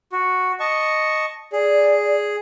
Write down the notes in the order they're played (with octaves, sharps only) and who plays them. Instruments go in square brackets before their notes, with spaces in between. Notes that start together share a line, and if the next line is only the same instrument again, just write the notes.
[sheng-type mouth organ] F#4
D#5 A5 C#6
[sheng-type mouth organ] G#4 [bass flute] D5